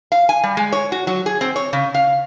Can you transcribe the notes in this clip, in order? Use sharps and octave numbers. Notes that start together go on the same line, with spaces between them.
F5
G#5
G3
G#3
C#5
F#4
F#3
G#4
C4
C#5
C#3
F5